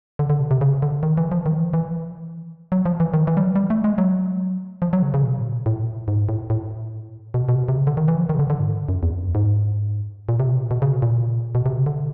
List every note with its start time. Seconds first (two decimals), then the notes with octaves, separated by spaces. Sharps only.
0.19 D3
0.30 D3
0.40 C3
0.51 C3
0.61 C#3
0.82 D3
1.03 D#3
1.18 E3
1.32 F3
1.46 D#3
1.53 F3
1.59 E3
1.74 E3
2.72 F#3
2.85 F3
3.00 E3
3.14 D#3
3.27 E3
3.37 G3
3.41 F#3
3.56 G3
3.70 A3
3.84 G#3
3.98 F#3
4.82 F3
4.93 F#3
5.03 C#3
5.14 C#3
5.24 B2
5.38 A2
5.45 A#2
5.66 A2
5.79 A#2
5.87 A2
6.08 G#2
6.29 A2
6.50 A2
7.34 B2
7.49 B2
7.55 C3
7.68 C3
7.76 C#3
7.87 D3
7.97 D#3
8.08 E3
8.18 F3
8.29 D#3
8.35 C#3
8.39 D3
8.50 D3
8.60 G#2
8.89 F#2
9.03 E2
9.13 F2
9.23 F#2
9.35 G#2
10.29 A#2
10.40 C3
10.50 B2
10.60 A#2
10.71 B2
10.82 C#3
10.92 B2
11.02 A#2
11.55 B2
11.66 C3
11.75 C#3
11.86 D3